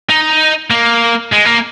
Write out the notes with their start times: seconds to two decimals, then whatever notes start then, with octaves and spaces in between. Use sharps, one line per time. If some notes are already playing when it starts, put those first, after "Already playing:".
0.10 D#4
0.70 A#3
1.32 G#3
1.45 A#3